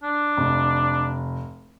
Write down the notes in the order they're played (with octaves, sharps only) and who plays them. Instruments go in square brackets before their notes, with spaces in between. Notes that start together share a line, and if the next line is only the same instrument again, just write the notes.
[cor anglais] D4
[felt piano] F1